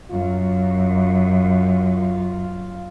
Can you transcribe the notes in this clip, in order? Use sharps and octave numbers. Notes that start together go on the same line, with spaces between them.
F#2 F4